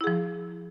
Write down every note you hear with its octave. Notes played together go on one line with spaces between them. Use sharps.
F3 E4 G#4